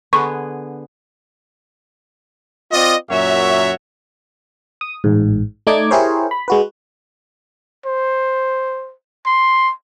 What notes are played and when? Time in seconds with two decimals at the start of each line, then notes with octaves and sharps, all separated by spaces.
0.13 D3 B3 G#4 C#6
2.72 C4 F4 D5 D#5
3.10 F#2 A#2 F#4 C#5 E5
4.81 D#6
5.04 A1 G#2
5.67 A3 D#4 D5 D6 G#6
5.91 E4 G4 G#4 A#4 C5 C#5
6.31 B5
6.48 G#3 F#4 B4
7.86 C5
9.26 C6